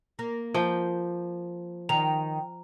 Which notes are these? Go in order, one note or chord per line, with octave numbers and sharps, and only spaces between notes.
A#3 A#4
F3 G5
D#3 A#5